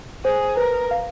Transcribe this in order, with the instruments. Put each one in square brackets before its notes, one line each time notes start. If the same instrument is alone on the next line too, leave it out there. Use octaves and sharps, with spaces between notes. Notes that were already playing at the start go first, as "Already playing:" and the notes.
[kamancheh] G#4 [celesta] C5
[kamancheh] A#4 [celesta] B4
[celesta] F5